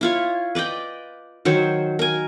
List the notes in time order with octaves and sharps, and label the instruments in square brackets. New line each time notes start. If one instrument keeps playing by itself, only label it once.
[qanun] E4 F4 C#5
B4 D5 D#5 G5
D#3 F#3 C5 C#5
A#4 G#5